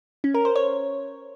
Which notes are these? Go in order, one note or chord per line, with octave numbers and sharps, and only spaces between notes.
C#4
A#4
C5
C#5